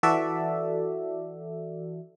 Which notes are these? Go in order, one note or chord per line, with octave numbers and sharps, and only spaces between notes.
E3 F#4 A4 D5 E5